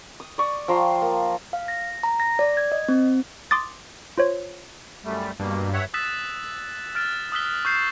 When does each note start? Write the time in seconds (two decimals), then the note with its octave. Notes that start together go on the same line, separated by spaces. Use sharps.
0.20 D#6
0.38 D5 C#6 D#6
0.68 F3 G5 A#5 C6
1.02 A#3
1.53 F5
1.68 A#6
2.03 A#5
2.20 A#6
2.39 D5
2.57 G#6
2.72 D#5
2.88 C4
3.51 C6 D6 D#6 A6
4.18 F4 C5 C#5
5.05 F#2 G3 A3
5.39 G2 B2 A#3
5.73 C#5 E5 F#5
5.94 D#6 E6 F#6 A6 B6 E7
6.95 F6 A6 D7
7.32 D#6 E6 F#6 B6 G7
7.65 C#6 G6 C7 E7